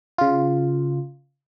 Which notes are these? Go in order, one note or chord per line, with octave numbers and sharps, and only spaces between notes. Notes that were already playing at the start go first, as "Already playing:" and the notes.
C#3 F4